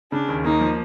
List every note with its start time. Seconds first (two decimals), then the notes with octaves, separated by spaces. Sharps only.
0.12 C#3 D4
0.29 D#2
0.44 A#3 D#4
0.61 F3